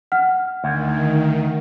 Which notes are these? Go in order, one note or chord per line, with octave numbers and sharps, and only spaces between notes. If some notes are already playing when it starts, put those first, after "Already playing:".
F#5 F6
D2 D#3